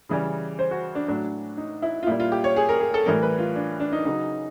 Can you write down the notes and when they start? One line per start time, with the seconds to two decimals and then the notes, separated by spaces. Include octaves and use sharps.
0.09 C#3 E3 G3
0.59 C5
0.71 F#4
0.95 D4
1.08 A2 F#3 D4
1.58 D#4
1.82 E4
2.03 F4
2.07 A#2 G3 E4
2.20 F4
2.32 G4
2.44 C#5
2.56 G#4
2.69 A#4
2.81 G#4
2.94 A4
3.06 A2 E3 G3 A#4
3.23 B4
3.39 F4
3.56 D4
3.80 D4
3.92 D#4
4.05 C#3 F#3 D#4